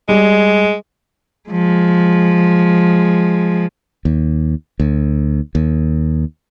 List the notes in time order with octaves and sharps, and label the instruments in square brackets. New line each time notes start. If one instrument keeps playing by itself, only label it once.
[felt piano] G3 [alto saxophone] G#3
[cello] F3 G#3
[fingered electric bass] D#2
D2
D#2